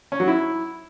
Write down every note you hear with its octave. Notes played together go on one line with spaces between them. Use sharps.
C#4
F#3
E4